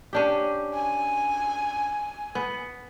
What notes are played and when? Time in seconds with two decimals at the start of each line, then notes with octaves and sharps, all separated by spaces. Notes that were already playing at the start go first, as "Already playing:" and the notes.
0.13 C#4 D4 G4
0.75 G#5
2.35 B3